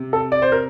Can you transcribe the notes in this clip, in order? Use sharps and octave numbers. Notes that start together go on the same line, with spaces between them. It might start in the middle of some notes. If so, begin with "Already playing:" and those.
Already playing: C3
A4
D5
C5
A#4